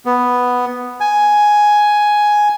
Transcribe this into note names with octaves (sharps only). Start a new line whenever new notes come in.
B3
G#5